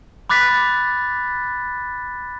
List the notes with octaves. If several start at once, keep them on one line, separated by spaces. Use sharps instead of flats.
B5 D6 F#6 A6 B6